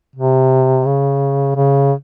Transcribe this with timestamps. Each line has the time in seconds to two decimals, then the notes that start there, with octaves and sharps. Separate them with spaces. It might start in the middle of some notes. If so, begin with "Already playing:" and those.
0.15 C3
0.86 C#3
1.56 C#3